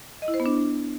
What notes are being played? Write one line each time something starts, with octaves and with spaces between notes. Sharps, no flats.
D#5
E4
C5
B3
D4